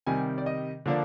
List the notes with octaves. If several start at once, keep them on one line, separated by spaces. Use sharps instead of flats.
C3 D#3 G3 G#5
D5
D#5
D3 F3 A#3 D4